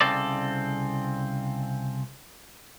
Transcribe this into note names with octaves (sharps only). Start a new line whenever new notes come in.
C2 C#3 C4 A4 D5